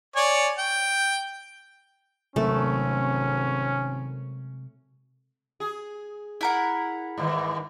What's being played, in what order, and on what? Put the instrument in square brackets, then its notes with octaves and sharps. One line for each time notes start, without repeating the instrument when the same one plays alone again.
[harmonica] C#5 D5 G#5
G5
[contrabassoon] G#1 [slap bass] C3 F#3 G#3 [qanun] A3 [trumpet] C#4
[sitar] G#4
[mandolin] E4 A#4 F#5
[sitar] G2 D#3 E3